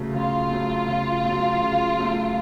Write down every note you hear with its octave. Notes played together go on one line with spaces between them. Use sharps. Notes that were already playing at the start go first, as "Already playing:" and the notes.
Already playing: C#3 F#3 A3
C#3 F4
F#3 A3
C#3
F#3 A3
C#3
F#3 A3